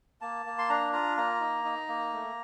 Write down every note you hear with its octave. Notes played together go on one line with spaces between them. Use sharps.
A#3 A5
A#3
C6
D4 A#5
F4 A#5
A#3 A#5
D#4
D#4
A#3
A3